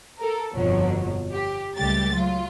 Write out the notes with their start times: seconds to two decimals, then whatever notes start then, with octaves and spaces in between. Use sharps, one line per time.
0.19 A4 A#4
0.54 G1 F2 B2 F3 F#3
1.32 G4
1.76 C#2 G3 A3 G4 A6
2.14 F#3 F4